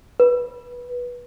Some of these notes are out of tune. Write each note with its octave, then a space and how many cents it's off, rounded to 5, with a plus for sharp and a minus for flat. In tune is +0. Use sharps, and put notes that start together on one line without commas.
B4 -15